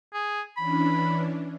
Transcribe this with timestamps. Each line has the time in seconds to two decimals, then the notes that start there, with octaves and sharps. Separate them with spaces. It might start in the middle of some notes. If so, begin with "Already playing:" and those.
0.13 G#4
0.57 E3 C#4 D4 B5